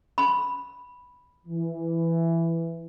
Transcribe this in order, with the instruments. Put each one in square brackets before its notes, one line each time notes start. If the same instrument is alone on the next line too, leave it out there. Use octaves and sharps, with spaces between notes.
[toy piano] B5
[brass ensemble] E3